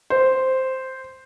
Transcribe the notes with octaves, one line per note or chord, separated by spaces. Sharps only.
C5